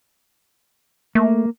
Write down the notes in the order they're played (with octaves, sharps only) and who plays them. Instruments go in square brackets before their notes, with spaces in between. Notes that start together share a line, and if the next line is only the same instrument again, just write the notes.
[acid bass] A3 [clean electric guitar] A#3